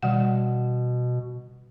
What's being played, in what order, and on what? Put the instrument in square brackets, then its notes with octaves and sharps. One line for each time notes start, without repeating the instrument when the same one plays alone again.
[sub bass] B2 [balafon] D#3 G3 F#5